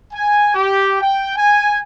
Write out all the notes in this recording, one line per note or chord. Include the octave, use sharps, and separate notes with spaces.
G#5
G4
G5
G#5